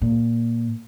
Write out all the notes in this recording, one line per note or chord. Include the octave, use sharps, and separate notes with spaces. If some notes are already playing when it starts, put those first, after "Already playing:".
A#2